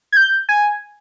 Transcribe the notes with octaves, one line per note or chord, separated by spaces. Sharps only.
G#6
G6
G#5